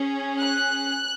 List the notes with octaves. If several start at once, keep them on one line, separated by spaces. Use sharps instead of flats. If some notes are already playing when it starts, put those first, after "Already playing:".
Already playing: C#4 G#4
F#6